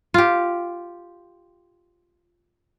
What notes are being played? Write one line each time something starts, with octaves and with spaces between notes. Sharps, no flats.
F4 G4